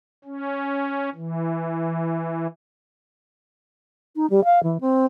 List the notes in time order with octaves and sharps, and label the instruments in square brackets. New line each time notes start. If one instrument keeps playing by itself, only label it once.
[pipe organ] C#4
E3
[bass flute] D#4
G3
F5
E3
C4